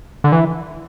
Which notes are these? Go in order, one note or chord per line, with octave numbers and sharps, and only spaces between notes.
D3
E3